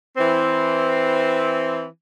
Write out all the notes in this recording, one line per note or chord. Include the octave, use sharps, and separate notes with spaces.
E3 C4